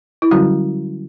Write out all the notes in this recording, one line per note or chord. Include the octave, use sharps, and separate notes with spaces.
E4
D3 F#3 G3 C#4 F#4